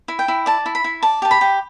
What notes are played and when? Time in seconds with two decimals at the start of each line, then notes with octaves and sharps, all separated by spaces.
0.08 E4
0.19 G5
0.28 E4
0.46 D5 A5
0.66 E4
0.75 B5
0.84 E4
1.03 D5 A5
1.22 G4 A5
1.31 B5
1.41 G4